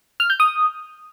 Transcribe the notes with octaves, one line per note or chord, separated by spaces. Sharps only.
F6
G6
D#6